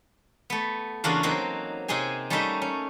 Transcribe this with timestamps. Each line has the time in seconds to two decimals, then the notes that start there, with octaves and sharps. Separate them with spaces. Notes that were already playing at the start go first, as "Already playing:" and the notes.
0.50 A3 B3
1.04 E2 C#3 A#3 D4 F4 F#4
1.23 F#3 A#3 C4 D#4
1.88 C3 C4 D#4 G#4 G#5
2.30 G3 A3 A#3 C#4 D#4 E5
2.62 C#4